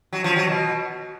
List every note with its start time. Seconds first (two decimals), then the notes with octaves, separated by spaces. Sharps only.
0.13 F#3
0.24 F3
0.36 F#3
0.48 B2